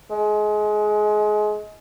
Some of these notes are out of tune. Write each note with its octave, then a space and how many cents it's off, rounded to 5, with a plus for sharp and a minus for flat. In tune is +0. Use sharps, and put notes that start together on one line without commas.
G#3 +25